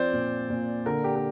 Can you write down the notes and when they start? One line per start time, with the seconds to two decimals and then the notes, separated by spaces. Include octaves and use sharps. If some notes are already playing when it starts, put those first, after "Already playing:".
Already playing: F3 C4 C5 D5
0.13 A#2
0.50 A#2
0.86 D3 A#4
1.04 G4
1.16 A#4